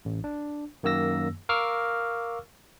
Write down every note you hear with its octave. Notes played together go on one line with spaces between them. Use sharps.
A1
D4
F#2 D#3 A#3 E6 A#6
A#4 F5 C#6 D6 E6 F6